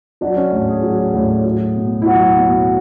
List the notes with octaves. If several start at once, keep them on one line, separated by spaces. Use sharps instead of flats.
F#3 D4
C#4
A2 D4
G#4
F#3
A2
F#3
B2
E4
F#3 F#4
B2